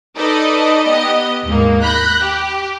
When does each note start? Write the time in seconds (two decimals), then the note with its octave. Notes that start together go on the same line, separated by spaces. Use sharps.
0.17 D#4 A4 B4 D5 D#5
0.87 B3 G4 D#5
1.45 D#2 G#2 A#3
1.82 B5 F#6 G6 A#6
2.21 G4